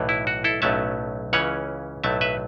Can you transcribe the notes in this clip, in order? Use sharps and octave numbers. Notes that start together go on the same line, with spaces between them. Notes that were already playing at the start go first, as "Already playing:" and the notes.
Already playing: B1 A2 E3
E4
F#4
E4 A4
B1 A2 F#3 A3 C#4 E5 A5
C#2 C#3 E3 C#4 C#5 F#5
B1 A2 F#3 A3 E5 A5
B4 E5